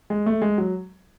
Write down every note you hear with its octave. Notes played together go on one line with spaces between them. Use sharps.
G#3
A3
G#3
F#3